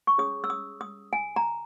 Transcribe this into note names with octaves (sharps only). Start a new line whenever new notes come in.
C#6
C#4 G#4 C#5 D#6
E6
D#6
D#6
G#5
A#5